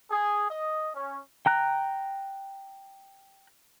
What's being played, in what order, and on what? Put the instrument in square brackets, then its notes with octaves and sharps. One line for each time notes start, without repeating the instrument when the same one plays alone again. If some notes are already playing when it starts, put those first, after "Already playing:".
[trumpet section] G#4
D#5
C#4
[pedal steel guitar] G5 A#5 F#6